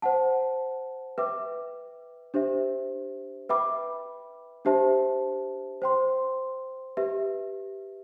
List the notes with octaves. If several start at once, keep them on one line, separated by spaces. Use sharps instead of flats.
C5 F#5 A5
B4 E5 G5 D6
D4 G4 C5 E5
B4 E5 G5 B5 D6
D4 G4 C5 E5 A5
C5 G5 C6
G4 B4 E5